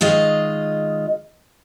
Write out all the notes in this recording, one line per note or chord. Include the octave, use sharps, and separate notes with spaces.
D#3 G#3 F4 D#5